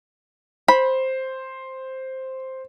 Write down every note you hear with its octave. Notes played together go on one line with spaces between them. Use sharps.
C5 B5